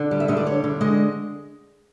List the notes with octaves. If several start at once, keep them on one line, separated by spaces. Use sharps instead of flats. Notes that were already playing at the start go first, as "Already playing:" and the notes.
Already playing: D3
G3
E5
D3 D#5
D5
G3 C#5
D3
G#3 D#5